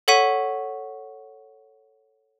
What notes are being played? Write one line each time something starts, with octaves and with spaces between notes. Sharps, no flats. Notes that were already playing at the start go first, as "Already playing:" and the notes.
A4 C#5 F#5 C#6 B6 D#7